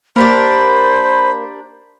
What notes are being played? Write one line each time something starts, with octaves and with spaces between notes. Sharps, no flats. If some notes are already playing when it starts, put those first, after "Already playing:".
A#3 D4 G4 A#4 C5 B5